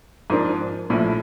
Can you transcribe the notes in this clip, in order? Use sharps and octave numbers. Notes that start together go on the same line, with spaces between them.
G#2 F3 A#3 D4
A#1 A2 F3